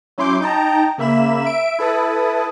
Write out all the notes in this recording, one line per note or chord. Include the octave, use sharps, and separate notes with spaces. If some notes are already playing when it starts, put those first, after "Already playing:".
F#3 C#4 E4 C6 D6 G6
D#4 G5 A5 A#5
C#3 A#3 E5 B5 E7
E5 D7
E4 A4 B4 D#6